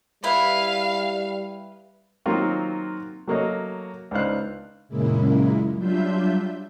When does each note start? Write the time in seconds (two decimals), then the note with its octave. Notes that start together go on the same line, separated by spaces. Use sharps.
0.24 G3 E4 B4 F5
2.26 D#3 F#3 A#3 C4 F4 F#4
3.27 F#3 A3 A#3 F#4 C#5 D#5
4.11 C#2 D4 D#4 C5 F5 F#6
4.89 F#2 A#2 C#3 G#3 A#3 E4
5.75 F#3 G3 D4 F4 E5 G6